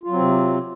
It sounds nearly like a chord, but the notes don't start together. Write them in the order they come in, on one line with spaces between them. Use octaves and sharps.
F4 F#3 C4 C3